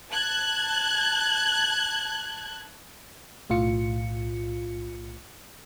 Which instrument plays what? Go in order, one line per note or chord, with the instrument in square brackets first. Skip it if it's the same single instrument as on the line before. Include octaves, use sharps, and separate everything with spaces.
[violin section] A5 F#6 G#6
[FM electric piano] B1 A2 F4 C#7